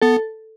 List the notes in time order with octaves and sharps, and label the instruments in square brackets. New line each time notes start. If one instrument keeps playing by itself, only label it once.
[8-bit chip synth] B3 [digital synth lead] A4